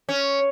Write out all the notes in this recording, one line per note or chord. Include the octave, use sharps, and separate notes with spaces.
C#4